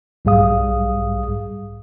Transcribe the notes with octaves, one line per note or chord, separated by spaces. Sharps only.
B1 G#2 G3 G#4 F5 D#6